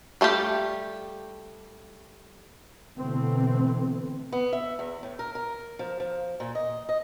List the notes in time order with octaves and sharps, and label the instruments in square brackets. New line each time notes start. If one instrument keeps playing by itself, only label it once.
[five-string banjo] G3 A3 F4 G4
[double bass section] B2 D3 E3 A3 B3 C4
[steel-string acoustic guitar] B3
E5
E2
A2
A#4
A#4
F3
F3
A#2
D#5
D#5